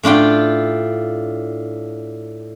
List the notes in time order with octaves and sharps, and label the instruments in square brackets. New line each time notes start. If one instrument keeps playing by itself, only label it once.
[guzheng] A2 D4 F4 G5